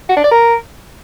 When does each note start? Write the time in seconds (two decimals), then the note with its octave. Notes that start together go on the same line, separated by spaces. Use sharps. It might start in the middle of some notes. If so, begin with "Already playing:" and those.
0.09 F#4
0.16 D4
0.24 D5
0.31 A#4